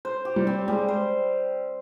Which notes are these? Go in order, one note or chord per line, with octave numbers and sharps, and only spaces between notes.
C5
G4
G3
C4
G3 G#3
C5